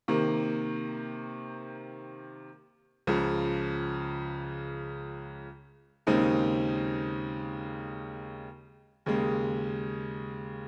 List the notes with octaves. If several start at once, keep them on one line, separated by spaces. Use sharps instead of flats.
C3 D#3 A#3
C#2 C#3 F3
D#2 C#3 G#3 C4 D#4
D#2 C#3 G#3